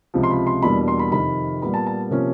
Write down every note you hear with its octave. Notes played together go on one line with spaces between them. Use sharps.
C#2 C3 F3
C6
B5
C6
E2 B2 G3 A#3 D4 B5
C6
B5
F2 C3 D#3 B5
A#2 G3 B3 B5
A5
A5
C3 F3 A#3 C#4